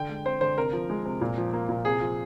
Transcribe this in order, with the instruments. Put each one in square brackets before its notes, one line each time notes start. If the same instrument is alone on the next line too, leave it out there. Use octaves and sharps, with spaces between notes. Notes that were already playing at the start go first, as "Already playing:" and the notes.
Already playing: [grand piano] D3 G5
G#3
C4 C5
D3 C5
C3 A#4
F3
G#3
C3
A#2
F3
A#3
A#2
C3 G#4
F3